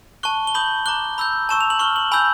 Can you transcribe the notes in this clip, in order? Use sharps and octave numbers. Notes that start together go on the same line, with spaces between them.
A5 C#6 F#6 G7
G7
B5 D#6 G6 F#7
A#5 D6 F#6 G7
B5 E6 G6
A5 C#6 E6 E7
F7
F#7
C#6 F6 G7
F#7
G#5 B5 E6 G6